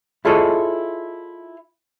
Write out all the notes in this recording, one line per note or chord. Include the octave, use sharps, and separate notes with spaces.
E4 F4 G#4 A4 C#5 D#5